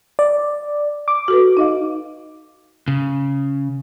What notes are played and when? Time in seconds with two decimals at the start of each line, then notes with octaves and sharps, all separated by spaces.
0.19 D5
1.08 D6
1.28 F#4 A4 B4
1.57 D#4 D#5 F5
2.88 C#3